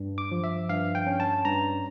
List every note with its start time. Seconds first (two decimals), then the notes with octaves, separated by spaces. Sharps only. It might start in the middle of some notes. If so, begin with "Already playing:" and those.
Already playing: G2
0.18 D6
0.32 F3
0.44 E5
0.69 G2 F5
0.95 G5
1.07 C#4
1.20 A5
1.45 G2 A#5